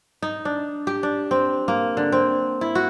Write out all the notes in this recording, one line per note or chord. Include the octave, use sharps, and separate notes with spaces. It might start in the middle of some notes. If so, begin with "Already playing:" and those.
D#4
D4
G4
D4
C4
A#3
D3
C4
E4
F#4